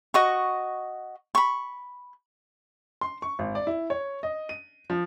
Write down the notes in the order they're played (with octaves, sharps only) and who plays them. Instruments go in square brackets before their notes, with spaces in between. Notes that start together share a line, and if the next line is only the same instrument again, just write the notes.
[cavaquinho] F#4 D#5 C#6
B5 C#6
[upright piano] C6
C#6
G#1
D5
E4
C#5
D#5
D#7
F3